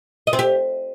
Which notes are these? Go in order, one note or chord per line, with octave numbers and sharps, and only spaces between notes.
D#5
C4
G4